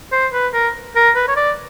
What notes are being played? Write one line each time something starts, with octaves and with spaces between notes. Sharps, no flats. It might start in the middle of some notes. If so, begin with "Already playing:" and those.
C5
B4
A#4
A#4
B4
C#5
D5